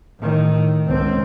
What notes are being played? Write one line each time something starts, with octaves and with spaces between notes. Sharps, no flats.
A2 D#3
C#2 C4